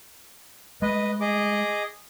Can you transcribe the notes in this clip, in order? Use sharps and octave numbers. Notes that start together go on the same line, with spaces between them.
G#3 A3 B4 D#5
G#4 D#5 D6